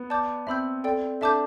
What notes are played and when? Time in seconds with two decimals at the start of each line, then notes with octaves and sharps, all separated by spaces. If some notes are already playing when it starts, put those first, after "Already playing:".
Already playing: B3
0.10 D5 A5 D6 G6
0.47 C4 E5 B5 E6 G6
0.84 A4 D5 G5
1.21 D4 A4 E5 A5 D6 G6